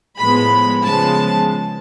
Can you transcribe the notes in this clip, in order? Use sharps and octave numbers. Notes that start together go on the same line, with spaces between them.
A2 F3 G#3 B3 B5
C#3 F3 G#3 B3 A5